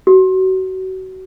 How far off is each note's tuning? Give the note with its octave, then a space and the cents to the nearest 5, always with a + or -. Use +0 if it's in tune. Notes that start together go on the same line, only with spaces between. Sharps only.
F#4 +25